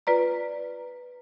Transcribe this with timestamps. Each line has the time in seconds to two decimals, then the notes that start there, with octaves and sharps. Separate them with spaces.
0.07 F4 B4 D5 A#5